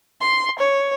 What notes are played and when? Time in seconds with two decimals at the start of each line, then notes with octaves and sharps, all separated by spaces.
0.21 C6
0.59 C#5